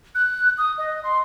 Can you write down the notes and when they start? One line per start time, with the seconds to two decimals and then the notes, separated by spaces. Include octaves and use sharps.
0.15 F#6
0.58 D#6
0.78 D#5
1.04 C6